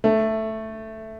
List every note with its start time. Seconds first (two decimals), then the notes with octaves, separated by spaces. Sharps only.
0.04 A3